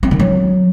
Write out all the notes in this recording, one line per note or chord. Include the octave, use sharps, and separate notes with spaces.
C4
D#3
F#3